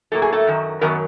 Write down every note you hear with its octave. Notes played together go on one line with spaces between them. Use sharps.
A2 F#3 A#3 A4
G#4
A3 A4
F#2 D#3 F#3
F#2 D#3 F#3 B3 A#4